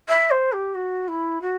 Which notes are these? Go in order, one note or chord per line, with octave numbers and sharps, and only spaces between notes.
E5
C5
G4
F#4
E4
F#4